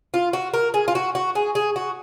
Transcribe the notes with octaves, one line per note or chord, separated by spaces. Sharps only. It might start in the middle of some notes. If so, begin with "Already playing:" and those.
F4
F#4
A#4
G#4
F4
F#4
F#4
G#4
G#4
F#4